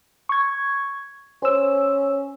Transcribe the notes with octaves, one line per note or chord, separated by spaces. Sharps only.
C#6 G#6
C#4 C5 E6